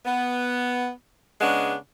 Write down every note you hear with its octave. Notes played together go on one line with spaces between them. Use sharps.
B3
C#3 G#3 B3 D4